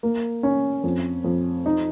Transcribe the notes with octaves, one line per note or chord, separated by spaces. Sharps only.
A#3
C#4
F2
F2
D#4